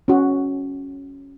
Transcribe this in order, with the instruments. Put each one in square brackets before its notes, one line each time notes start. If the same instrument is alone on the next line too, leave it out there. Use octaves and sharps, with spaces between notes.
[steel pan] C#4 F#4